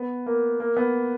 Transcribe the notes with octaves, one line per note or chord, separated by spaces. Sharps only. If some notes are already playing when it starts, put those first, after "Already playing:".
Already playing: B3
A#3
A#3
B3